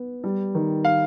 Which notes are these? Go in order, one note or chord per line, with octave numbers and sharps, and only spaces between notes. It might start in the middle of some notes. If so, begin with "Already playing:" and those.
Already playing: B3
G3
D#3
F5